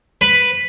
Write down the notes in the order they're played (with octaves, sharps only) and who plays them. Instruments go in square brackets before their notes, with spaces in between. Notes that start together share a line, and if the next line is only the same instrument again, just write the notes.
[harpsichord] B4